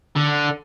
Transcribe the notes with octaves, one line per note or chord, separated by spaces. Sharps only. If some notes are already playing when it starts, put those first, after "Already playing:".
D3